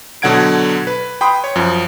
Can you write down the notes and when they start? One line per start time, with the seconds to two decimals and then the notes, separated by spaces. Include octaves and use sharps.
0.22 B2 D3 F#3 F#5 G#6 D7
0.87 B4
1.21 G5 B5 C6 D#6
1.44 C#5
1.56 F#2 F3